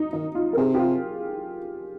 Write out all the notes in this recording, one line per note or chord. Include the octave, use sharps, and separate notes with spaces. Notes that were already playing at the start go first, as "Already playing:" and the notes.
Already playing: D#4
D#3 D#4
F4
A#4
C3 G#4
G4
F4